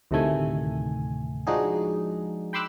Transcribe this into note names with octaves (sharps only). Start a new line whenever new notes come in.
D2 A2 C3 D#3 A3 G#5
F3 G#3 D4 D#4 F#4 G#4
G5 B5 C6 D6 E6 F#6